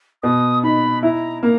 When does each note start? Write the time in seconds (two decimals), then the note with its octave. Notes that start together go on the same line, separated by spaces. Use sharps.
0.23 B2 D#6
0.63 D#4 B5
1.03 E4 A#5
1.43 A#3 A#5